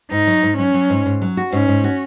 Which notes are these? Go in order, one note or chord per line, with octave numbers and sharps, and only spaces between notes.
G#2 D#4
F#3
G#2
F#3 C#4
F#3
G#2
G#2
F#3
F#4
G#2 C#4
G#2
F#4